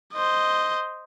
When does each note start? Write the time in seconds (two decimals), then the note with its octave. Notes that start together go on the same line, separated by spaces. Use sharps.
0.13 C5 D#5